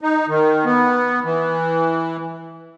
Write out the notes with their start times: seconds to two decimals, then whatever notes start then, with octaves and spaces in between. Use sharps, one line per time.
0.01 D#4
0.28 D#3
0.65 B3
1.24 E3